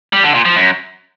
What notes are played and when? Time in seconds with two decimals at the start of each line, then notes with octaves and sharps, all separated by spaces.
0.13 G3
0.24 D3
0.34 A#2
0.45 F3
0.56 F#2